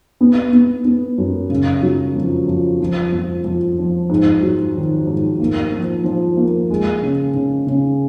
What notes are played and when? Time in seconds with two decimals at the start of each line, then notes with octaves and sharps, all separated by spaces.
0.21 B3
0.53 B3
0.85 B3
1.18 F#2
1.50 C#3
1.83 F#3
2.16 F2
2.48 F2
2.80 F3
3.12 F2
3.45 F2
3.78 F3
4.09 G#2
4.43 F#3
4.76 D#3
5.07 G#2
5.40 A#3
5.72 F3
6.04 F3
6.37 A#3
6.70 G#3
7.03 C#3
7.34 C#3
7.67 C#3